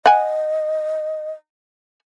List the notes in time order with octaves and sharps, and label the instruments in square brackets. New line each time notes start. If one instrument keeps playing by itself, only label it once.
[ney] D#5 [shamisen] F#5 G#5